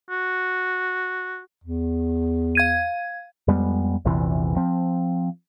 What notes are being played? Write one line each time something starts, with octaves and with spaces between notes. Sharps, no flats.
F#4
E2
F5 G#6 D#7
F2 G3 G#3 B3
A#1 E2 C3 E3
F3 C4